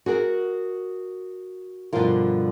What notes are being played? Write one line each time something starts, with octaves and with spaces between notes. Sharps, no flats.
F#4 G#4 A#4
G2 B2 D3 F3 F4 A#4